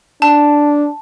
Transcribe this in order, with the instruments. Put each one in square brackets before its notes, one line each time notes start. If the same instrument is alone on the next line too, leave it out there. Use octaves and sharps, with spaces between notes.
[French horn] D4 [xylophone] A5